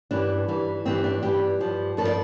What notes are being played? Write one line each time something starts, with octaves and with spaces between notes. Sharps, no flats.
G2 E3 G3 D4
G2 E3 G3
G2 E3 G3 C4
D4
G2 E3 G3 G4
G2 F3
G2 F3 A4
D5